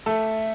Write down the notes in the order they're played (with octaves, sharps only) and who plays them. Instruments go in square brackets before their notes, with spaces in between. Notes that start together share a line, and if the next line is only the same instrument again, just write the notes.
[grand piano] A3 A4 [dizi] E5